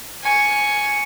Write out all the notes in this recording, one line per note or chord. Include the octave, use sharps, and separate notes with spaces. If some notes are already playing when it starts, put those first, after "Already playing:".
G#5 C#6